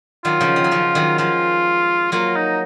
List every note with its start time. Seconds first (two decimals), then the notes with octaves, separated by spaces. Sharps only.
0.25 D#3 F#3 F4
0.41 C#3 F3
0.56 D#3
0.64 F#3
0.71 C#3 F3
0.95 D#3 F#3
1.18 F3 G#3 F4
2.12 F#3 A#3 F4
2.36 D#4